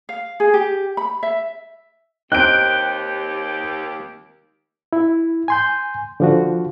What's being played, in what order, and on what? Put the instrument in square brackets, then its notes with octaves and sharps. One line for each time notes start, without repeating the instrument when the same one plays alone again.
[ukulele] F5
G#4
G4
B5
E5
[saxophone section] D#2 G4 [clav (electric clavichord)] C4 D#4 [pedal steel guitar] G5 [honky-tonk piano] F#6 D7
[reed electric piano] E4
G#5 C6 G6
D3 F3 F#4